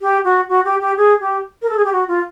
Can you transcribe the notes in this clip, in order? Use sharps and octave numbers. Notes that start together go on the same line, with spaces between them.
G4
F#4
F#4
G4
G4
G#4
G4
A#4
A4
G#4
G4
F#4
F4